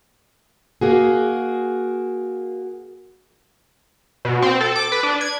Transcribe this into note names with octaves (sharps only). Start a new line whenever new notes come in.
A#3 F#4 G#4
B2
C4
A4
D6
B4
D4
G#6